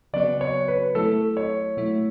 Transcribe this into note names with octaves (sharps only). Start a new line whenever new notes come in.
C#3 F#3 B3 F#4 D5
C#5
B4
F#3 A3 E4 A4
C#5
B2 F#3 A3 E4